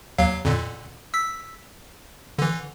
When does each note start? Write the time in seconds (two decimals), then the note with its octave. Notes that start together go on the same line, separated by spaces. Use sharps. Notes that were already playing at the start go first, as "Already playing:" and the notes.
0.18 D#2 F#3 F5
0.45 F2 A#2 D3
1.14 E6 B6
2.38 D3 E3